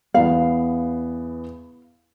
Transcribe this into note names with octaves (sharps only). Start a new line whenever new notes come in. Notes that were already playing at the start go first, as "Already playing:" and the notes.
E2 B3 F5